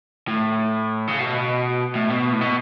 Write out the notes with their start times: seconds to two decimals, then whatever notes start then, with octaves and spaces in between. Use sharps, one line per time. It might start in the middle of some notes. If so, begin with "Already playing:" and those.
0.28 A2
1.07 C#3
1.19 B2
1.95 A2
2.10 B2
2.33 A2
2.41 B2